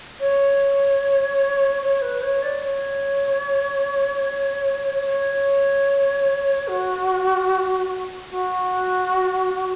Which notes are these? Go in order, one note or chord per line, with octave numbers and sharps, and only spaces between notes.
C#5
C#5
B4
C#5
D5
C#5
C#5
F#4
F#4